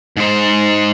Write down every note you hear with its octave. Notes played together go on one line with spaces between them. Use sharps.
G#2 C5